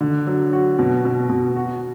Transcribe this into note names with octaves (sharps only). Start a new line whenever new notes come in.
D3
F#3
F#4
B2
B2
B2
F#4